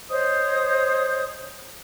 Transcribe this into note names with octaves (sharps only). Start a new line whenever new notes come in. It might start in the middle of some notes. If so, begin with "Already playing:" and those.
C5 C#5 D#5 D#6